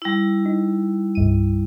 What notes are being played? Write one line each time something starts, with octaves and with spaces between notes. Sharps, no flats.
G3 E4
D#4
C2 G2 D#7